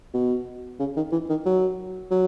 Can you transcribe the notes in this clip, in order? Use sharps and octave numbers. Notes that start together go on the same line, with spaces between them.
B2
C#3
D#3
E3
D#3
F#3
F#3